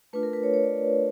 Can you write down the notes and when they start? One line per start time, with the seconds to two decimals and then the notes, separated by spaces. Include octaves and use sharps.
0.13 A3 D4 F4 B4
0.23 A#4
0.33 B4
0.43 C#5
0.54 C#5
0.64 D5